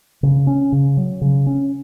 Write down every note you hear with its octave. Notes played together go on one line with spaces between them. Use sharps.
C#3
C#4
C#3
F#3
C#3
C#4